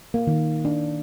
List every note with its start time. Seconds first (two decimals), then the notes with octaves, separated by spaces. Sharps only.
0.14 A#3
0.27 D#3
0.65 D4